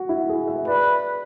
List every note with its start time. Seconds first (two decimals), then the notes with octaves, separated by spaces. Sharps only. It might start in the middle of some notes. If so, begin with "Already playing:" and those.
Already playing: F#4
0.09 E4
0.29 G#4
0.48 E5
0.67 B4 D5